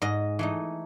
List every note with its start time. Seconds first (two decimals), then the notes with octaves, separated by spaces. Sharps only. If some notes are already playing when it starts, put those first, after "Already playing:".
0.02 G#2 D#5
0.39 E3 A3 D#4